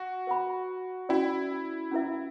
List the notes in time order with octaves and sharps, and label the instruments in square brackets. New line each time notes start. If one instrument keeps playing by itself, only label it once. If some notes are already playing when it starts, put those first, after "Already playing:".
Already playing: [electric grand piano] F#4
[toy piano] B4 F#5 B5
[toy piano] C#4 F#4 B4 D5 G5 [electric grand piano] E4
[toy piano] C#4 E4 B4 E5